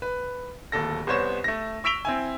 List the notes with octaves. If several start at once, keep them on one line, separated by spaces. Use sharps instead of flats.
B4
D1 D#2 A4 A#6
C2 B3 C5 C#5 E7
A3 A#6
C#6 E6 B6 D7 F7 G7
C4 E4 G#5